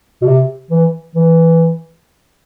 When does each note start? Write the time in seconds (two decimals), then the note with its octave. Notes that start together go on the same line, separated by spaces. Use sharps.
0.22 B2
0.26 C3
0.70 E3
1.15 E3